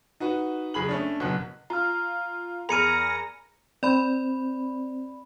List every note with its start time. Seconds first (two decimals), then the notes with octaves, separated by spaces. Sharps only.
0.20 D#4 F#4 B4
0.74 F#1 G#4 B5 F#7
0.89 A3 C#4 D4
1.20 F#1 B2 F#3 F#5 F#6
1.70 F4 A#5 F6
2.69 E2 G#4 A#4 A#5 B5 F6 C#7 D#7
3.83 C4 D5 B5